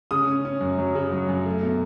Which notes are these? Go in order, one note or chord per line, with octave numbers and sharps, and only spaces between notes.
C#3 D#6
C#4
C#4
F#2
F#3
C#3
F#3
F#2
A3
B2